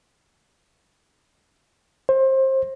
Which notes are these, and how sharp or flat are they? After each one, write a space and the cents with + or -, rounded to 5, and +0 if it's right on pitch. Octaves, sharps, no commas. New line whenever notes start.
C5 +25